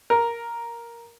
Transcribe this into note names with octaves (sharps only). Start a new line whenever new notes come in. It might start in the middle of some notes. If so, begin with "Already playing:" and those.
A#4